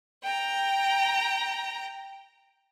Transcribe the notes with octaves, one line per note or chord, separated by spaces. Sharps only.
G5 A#5